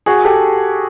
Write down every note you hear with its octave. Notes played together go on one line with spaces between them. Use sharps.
F#4 G#4
G4 A4